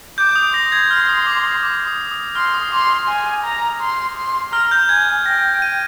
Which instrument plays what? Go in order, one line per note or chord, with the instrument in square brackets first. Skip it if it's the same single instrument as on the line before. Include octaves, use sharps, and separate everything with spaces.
[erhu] D6 [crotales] G6
[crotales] D#6
[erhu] C6 [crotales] A#6
[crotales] G#6
F6
D#6
D6
D6
D#6
D#6
[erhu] C6 [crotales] F6
[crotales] D#6
[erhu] C6 [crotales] D6
[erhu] G#5
A#5
C6
C6
[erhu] A#5 [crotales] F6
[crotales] G6
[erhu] G#5 [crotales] G#6
[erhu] G5 [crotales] A#6
[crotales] D#7